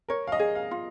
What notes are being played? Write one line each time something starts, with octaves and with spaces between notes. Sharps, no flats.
A#4 C#5
F5
D#5
G#4
F5
F4